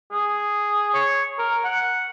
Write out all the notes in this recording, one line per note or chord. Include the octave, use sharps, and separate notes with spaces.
G#4
C#5
A#4
F#5